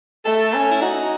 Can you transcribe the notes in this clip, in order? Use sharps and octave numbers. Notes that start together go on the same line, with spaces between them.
A3 A4
C#4
E4
D#4 F#4